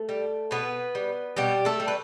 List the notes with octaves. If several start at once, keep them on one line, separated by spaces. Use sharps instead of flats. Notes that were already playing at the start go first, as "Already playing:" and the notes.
Already playing: A3 A4
G3
B2 B3 B4
G3
B2 G3 G4
A3 A4
G3
B4